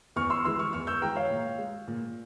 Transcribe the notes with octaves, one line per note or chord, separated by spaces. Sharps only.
E2 C#6 F6
C6 E6
E3 G#3 C6 E6
C#6 F6
E2 C#6 F6
E6 G6
E3 G#3 G5 A#5
C#5 F5
A#2
G#3
A#2